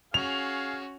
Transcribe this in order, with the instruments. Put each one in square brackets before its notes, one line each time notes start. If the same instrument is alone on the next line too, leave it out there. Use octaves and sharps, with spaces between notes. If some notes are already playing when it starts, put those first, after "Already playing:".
[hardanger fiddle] C#4 F#4 [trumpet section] G#4 F5 [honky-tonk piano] F7